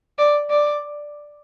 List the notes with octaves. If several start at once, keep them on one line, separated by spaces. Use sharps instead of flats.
D5
D5